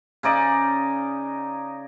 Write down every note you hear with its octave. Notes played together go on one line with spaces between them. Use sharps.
C#3 D#4 D5 D#5